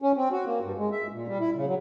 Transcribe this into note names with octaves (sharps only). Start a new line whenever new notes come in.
C#4
C4
F#4
A#3
G2
G#3
E5
A#2
G3
E4
C#3
F#3